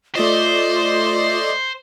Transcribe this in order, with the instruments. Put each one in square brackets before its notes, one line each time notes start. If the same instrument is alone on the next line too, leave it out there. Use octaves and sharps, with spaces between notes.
[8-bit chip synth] A3 D5 D#5 [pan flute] F4 [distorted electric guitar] C5